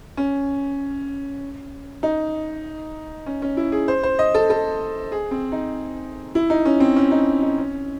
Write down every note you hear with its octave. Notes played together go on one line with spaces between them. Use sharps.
C#4
D#4
C#4
C#4
E4
G#4
C5
C5
D#5
A4
A4
G#4
C4
D#4
E4
D#4
C#4
C4
C#4
D#4
D#4
C#4